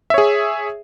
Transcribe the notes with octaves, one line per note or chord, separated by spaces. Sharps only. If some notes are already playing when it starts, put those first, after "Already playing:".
G#4 C#5 E5